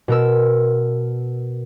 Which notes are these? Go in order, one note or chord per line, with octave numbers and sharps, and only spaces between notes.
B2 A#4 E6